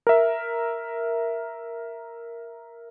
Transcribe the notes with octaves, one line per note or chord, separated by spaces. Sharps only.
A#4 E5